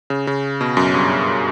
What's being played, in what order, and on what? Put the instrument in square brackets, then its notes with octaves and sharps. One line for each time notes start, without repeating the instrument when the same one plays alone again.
[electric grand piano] C#3
C#3
B2
F#2
G2